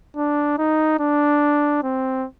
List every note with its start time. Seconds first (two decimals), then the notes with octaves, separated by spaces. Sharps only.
0.16 D4
0.58 D#4
1.00 D4
1.83 C4